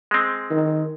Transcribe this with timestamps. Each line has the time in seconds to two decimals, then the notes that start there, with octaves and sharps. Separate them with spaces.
0.11 G#3 C4
0.51 D#3